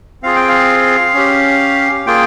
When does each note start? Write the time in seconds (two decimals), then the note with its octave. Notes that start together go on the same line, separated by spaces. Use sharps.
0.22 C4 F4 G#4 F5
0.36 G5
0.49 F5
1.14 C#4 G4
2.07 A#3 F4 G#4 G5